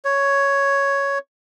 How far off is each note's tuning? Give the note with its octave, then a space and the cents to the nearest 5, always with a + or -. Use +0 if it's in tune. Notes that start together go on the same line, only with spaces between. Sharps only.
C#5 +5